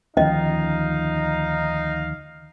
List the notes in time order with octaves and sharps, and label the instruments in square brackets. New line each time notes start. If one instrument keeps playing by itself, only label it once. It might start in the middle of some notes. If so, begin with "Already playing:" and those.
[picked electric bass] D2 D#3 F3 [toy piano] C#4 D#5 [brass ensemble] D#4 F5